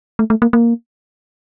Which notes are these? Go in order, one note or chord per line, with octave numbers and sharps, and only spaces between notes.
A3
A3
A#3
A#3